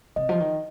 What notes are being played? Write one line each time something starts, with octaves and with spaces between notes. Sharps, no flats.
C3 D#5
F3
D#3